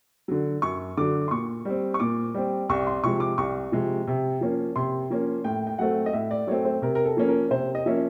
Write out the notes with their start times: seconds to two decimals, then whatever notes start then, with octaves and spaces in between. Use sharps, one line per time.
0.28 D3 F#3
0.62 F#2 C#6
0.97 D3 F#3 D6
1.28 C6
1.31 A#2 C#6
1.65 G3 C4
1.94 C#6
2.00 A#2 D6
2.34 G3 C4
2.69 C2 C#6
2.87 C6
3.03 C3 F3 G#3 C#6
3.20 D6
3.38 C2 C#6
3.72 C3 F3 G#3
4.07 C3
4.41 F3 A#3 C#4
4.76 C3 C6
5.10 F3 A#3 C#4
5.44 A2 G5
5.67 G5
5.79 F#3 A3 C4 F#5
6.06 D#5
6.13 A2 E5
6.31 D5
6.47 F#3 A3 C4 C#5
6.65 C5
6.82 C3 A#4
6.95 A#4
7.05 A4
7.17 F3 A#3 C#4
7.28 A#4
7.51 C3 C5
7.75 D#5
7.86 F3 A#3 C#4 E5